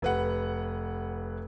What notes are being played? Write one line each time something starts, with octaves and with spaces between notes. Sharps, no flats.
F1 B4 F#5